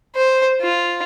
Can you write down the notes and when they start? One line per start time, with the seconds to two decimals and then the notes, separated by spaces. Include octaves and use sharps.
0.15 C5
0.62 F4